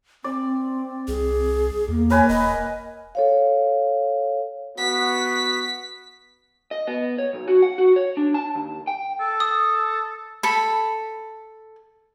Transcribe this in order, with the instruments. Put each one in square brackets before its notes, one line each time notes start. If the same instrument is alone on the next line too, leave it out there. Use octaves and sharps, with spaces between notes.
[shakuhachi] C4 [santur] D5
[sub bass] C2 [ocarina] G#4
[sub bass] E2 [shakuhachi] A#3
[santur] A#4 B4 G#5 [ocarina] C#5
[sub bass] E1 [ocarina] D#5
[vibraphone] A4 C#5 F5
[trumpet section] B3 F#4 [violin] B6
[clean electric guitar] D#5
B3
C#5
B1
F#4
F#5
F#4
C#5
D4
A5
D#2
G5
[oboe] A4
[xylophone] D#6
[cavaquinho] A4 B5